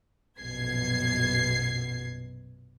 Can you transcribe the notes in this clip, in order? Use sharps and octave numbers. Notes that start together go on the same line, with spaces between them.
A#1 F#2 B2 G#6 C7